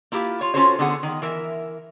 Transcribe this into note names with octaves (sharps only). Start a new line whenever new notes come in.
A#3 E4 F4 G4
F4 C#5
C#4 F4 F#4 A4 C5 C#5
D3 B3 G#4 F#5
D#3
E3 A#4 E5